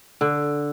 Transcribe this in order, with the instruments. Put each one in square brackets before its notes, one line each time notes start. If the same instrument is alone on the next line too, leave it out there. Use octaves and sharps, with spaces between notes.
[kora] D3